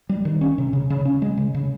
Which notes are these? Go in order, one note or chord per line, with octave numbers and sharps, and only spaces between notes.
G3
D#3
C#4
C3
C#3
C#3
C#4
G#3
C#3
C#3